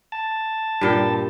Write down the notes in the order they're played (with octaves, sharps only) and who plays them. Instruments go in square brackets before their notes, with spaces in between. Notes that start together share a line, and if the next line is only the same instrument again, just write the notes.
[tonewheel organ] A5
[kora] G2 A#2 G5